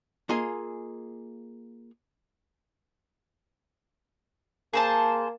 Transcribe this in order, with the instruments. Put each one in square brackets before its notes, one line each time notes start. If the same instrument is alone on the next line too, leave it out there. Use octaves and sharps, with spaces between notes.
[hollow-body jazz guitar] A#3 F4 G#4 D#5 G#5
[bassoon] A#3 [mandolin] G#4 C5 A5